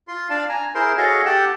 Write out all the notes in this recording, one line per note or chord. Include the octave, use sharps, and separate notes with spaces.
F4 C6
D4 D5 F5 A5
G#5 A#5
E4 G#4 A#4 C5 C6
F#4 G#4 A4 C#5 D#5 F5
G4 A4 F#5 G5 A5